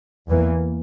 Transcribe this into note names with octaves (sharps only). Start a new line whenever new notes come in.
E2 E3 A#3